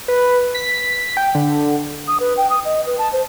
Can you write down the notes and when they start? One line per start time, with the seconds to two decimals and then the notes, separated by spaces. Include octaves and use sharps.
0.08 B4
0.54 B6
1.17 G5
1.35 D3
2.07 D#6
2.20 B4
2.37 G5
2.50 D#6
2.65 D#5
2.86 B4
2.98 A5
3.12 C5